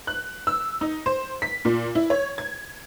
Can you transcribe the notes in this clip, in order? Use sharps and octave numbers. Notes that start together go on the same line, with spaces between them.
F#6
E6
D#4
C5
B6
A#2
E4
C#5
G#6